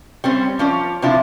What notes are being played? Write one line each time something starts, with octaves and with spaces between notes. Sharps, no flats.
G3 C4 C#4
F3 C#4 D5
C3 F3 D4 E4 F4